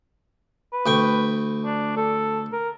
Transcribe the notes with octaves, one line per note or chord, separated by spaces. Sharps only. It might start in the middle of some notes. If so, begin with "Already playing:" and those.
B4
D2 G5 C#6
D4
A4
A#4